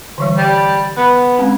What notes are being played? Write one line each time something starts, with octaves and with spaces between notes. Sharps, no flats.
D3 E3 G3
G3 G5
B3
G#3 C4 C#4